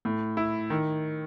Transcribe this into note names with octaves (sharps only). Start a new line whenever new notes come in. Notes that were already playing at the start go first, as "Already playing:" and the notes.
A2
E4
D#3